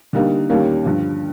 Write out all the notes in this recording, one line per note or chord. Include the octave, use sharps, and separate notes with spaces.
D3 G3 A#3 D#4
D#2 D#3 G3 A#3 C#4
G2 D3 F3